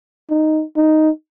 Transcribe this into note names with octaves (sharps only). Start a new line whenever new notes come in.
D#4
D#4